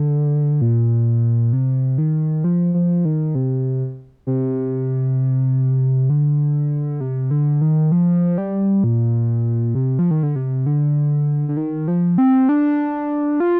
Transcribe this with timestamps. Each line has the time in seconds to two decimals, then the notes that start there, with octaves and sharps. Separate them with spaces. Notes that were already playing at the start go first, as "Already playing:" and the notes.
Already playing: D3
0.61 A#2
1.53 C3
1.98 D#3
2.44 F3
2.74 F3
3.05 D#3
3.35 C3
4.27 C3
6.10 D3
7.01 C3
7.31 D3
7.61 D#3
7.92 F3
8.38 G3
8.84 A#2
9.75 C3
9.99 F3
10.11 D#3
10.23 D3
10.36 C3
10.66 D3
11.49 D3
11.57 D#3
11.88 F3
12.18 C4
12.49 D4
13.40 F4